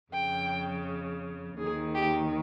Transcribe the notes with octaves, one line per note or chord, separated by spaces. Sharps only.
F2 C#3 G5
D#2 D#3 G#4
G4